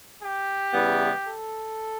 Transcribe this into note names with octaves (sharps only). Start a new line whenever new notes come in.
G4
C#3 E3 G3 B3 E4
A4